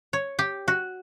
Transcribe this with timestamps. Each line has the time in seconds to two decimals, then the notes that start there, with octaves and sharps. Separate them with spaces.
0.13 C#5
0.39 G4
0.68 F#4